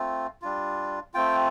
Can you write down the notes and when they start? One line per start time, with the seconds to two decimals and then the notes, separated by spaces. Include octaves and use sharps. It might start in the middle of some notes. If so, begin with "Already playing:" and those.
Already playing: A3 C4 F4
0.42 G3 D4 F4
1.14 A3 C4 F4 G5